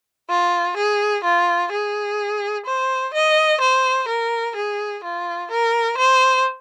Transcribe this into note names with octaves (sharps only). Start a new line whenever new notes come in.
F4
G#4
F4
G#4
C5
D#5
C5
A#4
G#4
F4
A#4
C5